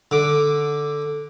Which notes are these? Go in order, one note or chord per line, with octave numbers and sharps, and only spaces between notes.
D3 D6